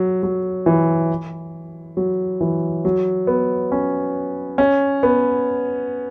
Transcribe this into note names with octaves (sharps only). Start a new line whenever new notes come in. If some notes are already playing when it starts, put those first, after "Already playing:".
Already playing: F#3
F#3
E3
F#3
E3
F#3
B3
C#4
C#4
B3